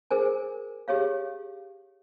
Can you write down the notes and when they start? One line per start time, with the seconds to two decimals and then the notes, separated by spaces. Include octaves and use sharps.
0.11 G#4 A#4 C5 G#5
0.88 G4 G#4 C#5 F5